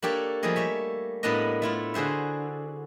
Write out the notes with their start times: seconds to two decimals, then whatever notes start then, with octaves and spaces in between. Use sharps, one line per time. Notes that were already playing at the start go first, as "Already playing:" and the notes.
0.03 A#3 D4 G4 A4 C#5
0.43 F3 G3 A3 A#3 G#4 D#5
0.56 G4 C#5 E5
1.23 A2 G3 A#3 B3 D4 D#5
1.62 A3 E4 F4
1.94 D3 F#4 G#4 C5 E5